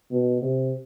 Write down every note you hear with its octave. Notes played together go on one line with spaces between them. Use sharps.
B2
C3